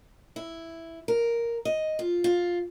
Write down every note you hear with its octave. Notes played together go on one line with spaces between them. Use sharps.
E4
A#4
D#5
F4
F4